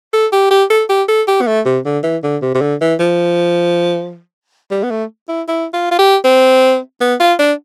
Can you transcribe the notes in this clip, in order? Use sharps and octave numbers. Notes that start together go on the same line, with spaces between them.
A4
G4
G4
A4
G4
A4
G4
B3
A3
C3
D3
E3
D3
C3
C3
D3
E3
F3
G3
B3
A3
E4
E4
F4
F4
G4
C4
B3
F4
D4